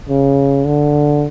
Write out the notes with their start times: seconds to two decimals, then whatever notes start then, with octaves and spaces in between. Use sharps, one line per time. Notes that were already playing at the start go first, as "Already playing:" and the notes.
0.09 C#3
0.66 D3